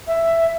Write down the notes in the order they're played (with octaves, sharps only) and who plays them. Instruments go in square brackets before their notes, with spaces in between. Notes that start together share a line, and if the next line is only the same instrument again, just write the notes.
[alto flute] E5